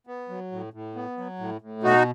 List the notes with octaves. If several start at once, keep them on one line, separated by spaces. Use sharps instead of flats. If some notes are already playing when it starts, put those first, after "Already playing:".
B3
F#3
A2
A2
B3
F#3
A2
A2
B2 D#4 F#4